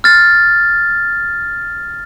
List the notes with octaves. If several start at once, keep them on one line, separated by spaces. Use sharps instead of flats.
F6 A6